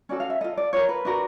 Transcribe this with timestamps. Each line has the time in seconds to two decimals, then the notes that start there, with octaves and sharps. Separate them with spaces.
0.09 C#4 F#4 A4 D5
0.20 F5
0.30 E5
0.41 F4 A4 D#5
0.57 D5
0.73 F4 A#4 C#5
0.89 B4
1.05 D4 F#4 A#4